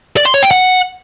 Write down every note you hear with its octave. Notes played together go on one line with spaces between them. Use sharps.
D5
C6
C#5
G5
F#5